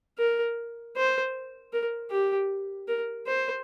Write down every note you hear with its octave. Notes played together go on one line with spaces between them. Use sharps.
A#4
C5
A#4
G4
A#4
C5